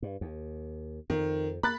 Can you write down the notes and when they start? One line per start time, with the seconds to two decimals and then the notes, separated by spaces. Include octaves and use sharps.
0.02 G2
0.21 D#2
1.10 F2 D#3
1.63 A#3 B5 F#6 A6